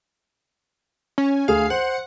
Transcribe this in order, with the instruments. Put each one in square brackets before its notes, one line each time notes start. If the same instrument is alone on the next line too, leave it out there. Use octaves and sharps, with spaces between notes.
[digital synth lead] C#4
[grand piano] D2 G#4 [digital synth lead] F5
[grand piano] C5 [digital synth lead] F#5